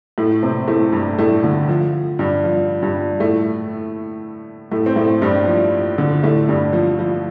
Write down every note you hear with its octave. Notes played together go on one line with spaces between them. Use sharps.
A2 A3
C3 C4
A2 A3
G2 G3
A2 A3
D3
F3
G2 G3
F3
G2 G3
A2 A3
A2 A3
C4
A2 A3
G2 G3
F3
D3
A2 A3
G2 G3
F3
F3